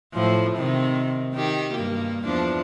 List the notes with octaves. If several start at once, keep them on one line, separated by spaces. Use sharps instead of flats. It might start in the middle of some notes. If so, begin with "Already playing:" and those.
A2 F3
C3 D#3
D#3 G4
G2 A#3
E2 F3 D4